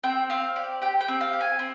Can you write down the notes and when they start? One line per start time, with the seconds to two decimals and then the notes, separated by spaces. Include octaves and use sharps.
0.04 C4 G5
0.30 C4 F5
0.56 G4 D5
0.82 G4 G5
1.01 G5
1.08 C4
1.21 F5
1.33 G4
1.41 G#5
1.59 C4